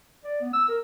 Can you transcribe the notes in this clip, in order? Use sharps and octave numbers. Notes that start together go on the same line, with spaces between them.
D5
B3
E6
A#4